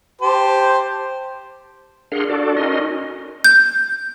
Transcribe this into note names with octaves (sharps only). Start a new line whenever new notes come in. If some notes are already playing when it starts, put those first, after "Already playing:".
G4 C5 A5
D4 G#4 A#4 F5 F#5 C6
D4 F#4 A4 D5
C#4 D#4 F#4 A#4 D#5 C6
G6